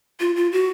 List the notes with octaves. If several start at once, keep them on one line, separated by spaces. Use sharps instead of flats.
F4
F4
F#4